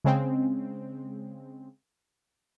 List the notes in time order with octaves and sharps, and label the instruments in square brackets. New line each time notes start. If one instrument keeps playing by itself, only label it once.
[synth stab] C#3 G#3 C4